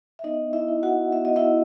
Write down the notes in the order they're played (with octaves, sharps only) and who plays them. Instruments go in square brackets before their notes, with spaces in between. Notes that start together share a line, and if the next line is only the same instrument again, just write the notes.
[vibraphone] E5
B3 D#4 D#5
E4 E5
E4
F#4 F#5
B3 E5
D#5
E4 E5